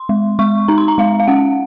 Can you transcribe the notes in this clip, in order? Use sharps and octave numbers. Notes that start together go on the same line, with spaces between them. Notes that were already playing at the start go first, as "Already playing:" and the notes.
Already playing: C6
G#3
G#3 C#6
D#4 A#5
C6
A#5
G#3 F5
F5
C#4 F#5